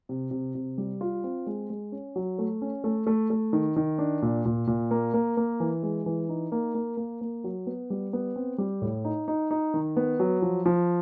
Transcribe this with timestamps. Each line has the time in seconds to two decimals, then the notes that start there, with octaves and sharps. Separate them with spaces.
0.09 C3
0.31 C3
0.55 C3
0.78 G3
1.01 F4
1.24 C4
1.47 G#3
1.70 G#3
1.92 C#4
2.16 F#3
2.39 A3
2.62 C#4
2.84 A3
3.07 A3
3.30 A3
3.53 D#3
3.76 D#3
3.98 D4
4.22 A#2
4.45 A#2
4.67 A#2
4.91 A#3
5.14 A#3
5.37 A#3
5.60 E3
5.83 G#3
6.06 E3
6.29 D#4
6.52 A#3
6.75 A#3
6.97 A#3
7.21 A#3
7.44 F#3
7.67 B3
7.90 G3
8.13 B3
8.36 C4
8.58 G3
8.82 A2
9.05 D#4
9.28 D#4
9.51 D#4
9.74 D#3
9.97 B3
10.19 F#3
10.42 F3
10.66 F3